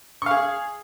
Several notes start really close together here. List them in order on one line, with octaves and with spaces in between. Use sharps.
C#6 F5 G#4